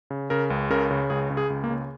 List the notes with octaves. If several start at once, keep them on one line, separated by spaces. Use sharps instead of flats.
C#3
C#3 A#4
C#2
C#3 A#4
C#3
C#2 G#4
C#3
G#4
C#2
A#3
C#3